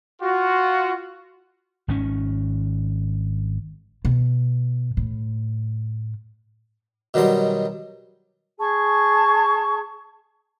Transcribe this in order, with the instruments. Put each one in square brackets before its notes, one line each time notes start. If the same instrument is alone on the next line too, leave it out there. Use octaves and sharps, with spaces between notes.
[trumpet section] F4 F#4
[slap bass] G#1 D#3 C#4
[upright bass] B2
A2
[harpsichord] B2 D#3 F#3 G3 C6
[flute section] G#4 A5 C#6